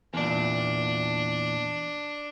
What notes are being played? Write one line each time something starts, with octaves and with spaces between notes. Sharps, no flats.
E2 A#2 D4